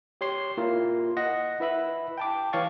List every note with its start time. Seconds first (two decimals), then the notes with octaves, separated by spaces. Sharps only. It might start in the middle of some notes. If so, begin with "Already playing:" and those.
0.21 G4 C#5 C6 C7
0.57 A#3 E4 F4 A#4
1.17 D#5 F#5 A#6
1.60 E4 B4 E5 B5
2.18 G5 A5 D6
2.53 E3 C#5 F5 C#6 A6